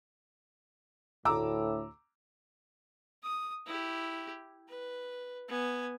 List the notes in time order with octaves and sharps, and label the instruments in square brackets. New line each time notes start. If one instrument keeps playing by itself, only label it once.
[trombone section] D2 A2 [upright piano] A#5 D6 E6
[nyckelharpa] D#6
E4 G4
B4
B3 G#5